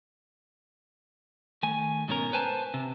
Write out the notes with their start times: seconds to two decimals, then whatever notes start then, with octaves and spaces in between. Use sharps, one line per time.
1.63 D#3 A3 G#5
2.08 G#2 B2 C#4 A#4
2.33 B4 C5 G#5 A5
2.74 C3